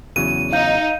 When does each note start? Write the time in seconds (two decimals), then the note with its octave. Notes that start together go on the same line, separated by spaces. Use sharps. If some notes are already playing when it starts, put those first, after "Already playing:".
0.16 E2 C#3 F#3 D#7
0.53 D#4 F5 G6